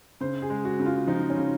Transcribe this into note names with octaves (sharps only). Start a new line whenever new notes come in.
C#3 C5
G#4
G#3
F#4
C#3
F4
F3 D#4
C#4
C#3